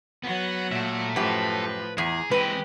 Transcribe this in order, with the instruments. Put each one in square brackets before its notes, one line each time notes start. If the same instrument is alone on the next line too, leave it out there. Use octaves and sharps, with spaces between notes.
[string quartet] F#3 F#5 [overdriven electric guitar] B3
[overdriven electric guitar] A#2 [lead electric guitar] A4 E5
[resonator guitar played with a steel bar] F#2 G4 [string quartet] A2 F3 [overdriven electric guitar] B4
[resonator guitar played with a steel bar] E2 [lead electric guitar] G#4 [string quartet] A#5
[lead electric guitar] E3 C4 [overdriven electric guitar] G#3 [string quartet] G4 [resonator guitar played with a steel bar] B4